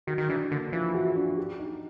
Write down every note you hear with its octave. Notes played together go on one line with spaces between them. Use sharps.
D#3 F#4
D#3
E3 D4
D3 A#3
E3 F3
F#4
D4
G4
D#4